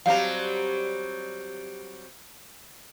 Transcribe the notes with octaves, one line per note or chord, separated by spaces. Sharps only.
F#3 G3 C4 F5 A#5